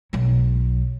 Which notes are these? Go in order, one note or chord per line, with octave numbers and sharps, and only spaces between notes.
B1 F#3